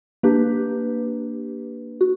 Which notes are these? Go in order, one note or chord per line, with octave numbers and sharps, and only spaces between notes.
A#3 D4 G4 B4
F#4